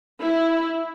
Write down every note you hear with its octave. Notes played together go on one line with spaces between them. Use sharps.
E4